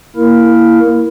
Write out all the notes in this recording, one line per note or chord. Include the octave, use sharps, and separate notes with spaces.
A#3 E4 A#4